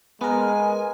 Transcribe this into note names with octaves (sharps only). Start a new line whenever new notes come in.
G#3 B3 A#4 G#5